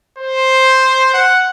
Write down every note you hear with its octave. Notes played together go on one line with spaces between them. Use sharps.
C5
F#5